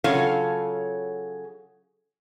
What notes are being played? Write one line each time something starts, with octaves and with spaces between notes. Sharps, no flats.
C#3 F#3 F4 A4 C#5 F5